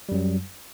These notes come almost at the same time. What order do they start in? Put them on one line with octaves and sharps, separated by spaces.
G3 F#2 F#3